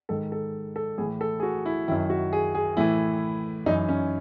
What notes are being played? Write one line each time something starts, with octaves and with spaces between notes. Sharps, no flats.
G#2 D#3 A4
A4
A4
A2 E3 G#4
A4
G#4
F#4
E4
F#2 D#3 E4
F#4
G#4
G#4
A2 E3 E4
F#2 E3 D#4
C#4